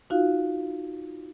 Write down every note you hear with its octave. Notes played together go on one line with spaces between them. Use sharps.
D#4 F4 F#4 F5